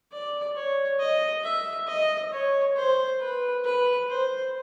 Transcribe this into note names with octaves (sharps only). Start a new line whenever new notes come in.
D5
C#5
D#5
E5
D#5
C#5
C5
B4
B4
C5